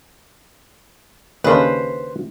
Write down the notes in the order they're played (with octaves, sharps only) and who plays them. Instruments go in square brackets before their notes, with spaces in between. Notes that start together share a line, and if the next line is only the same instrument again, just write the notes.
[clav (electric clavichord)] D#2 C#3 D4 [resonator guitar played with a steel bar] B4 C5